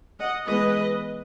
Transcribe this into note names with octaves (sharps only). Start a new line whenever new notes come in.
D#5 F#5
E3 G#3 B3 B4 D#5